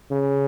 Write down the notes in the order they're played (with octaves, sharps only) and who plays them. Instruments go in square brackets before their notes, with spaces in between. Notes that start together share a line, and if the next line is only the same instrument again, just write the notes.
[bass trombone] C#3